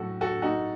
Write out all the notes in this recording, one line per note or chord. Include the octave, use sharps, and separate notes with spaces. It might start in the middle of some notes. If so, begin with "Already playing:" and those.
Already playing: A2 F#3 F#4 A4
F#4 A4
D#4 F#4